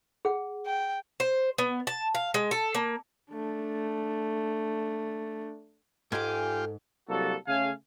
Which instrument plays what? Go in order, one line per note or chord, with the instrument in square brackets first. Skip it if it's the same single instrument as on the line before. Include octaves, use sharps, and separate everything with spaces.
[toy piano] G#4 F#5
[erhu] G5
[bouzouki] C5
B3
A5
F5
G#3
A4
A#3
[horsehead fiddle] A3 D4
[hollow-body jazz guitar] G#2 [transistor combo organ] F4 G4 [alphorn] A4 [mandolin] G#5 D6
[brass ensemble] C2 F#3 G3 A#3 F#4 A4
C#3 A3 F5 G#5